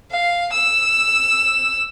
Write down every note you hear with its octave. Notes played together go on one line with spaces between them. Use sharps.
F5
E6